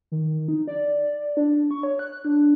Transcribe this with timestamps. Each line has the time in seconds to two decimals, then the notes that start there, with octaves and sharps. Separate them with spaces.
0.12 D#3
0.48 D#4
0.68 D5
1.37 D4
1.71 C#6
1.83 C#5
1.99 F#6
2.25 D4